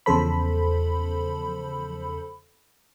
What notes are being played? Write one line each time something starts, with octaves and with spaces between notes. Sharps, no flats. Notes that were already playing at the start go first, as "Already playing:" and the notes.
E2 C#3 F3 A4 C5 B5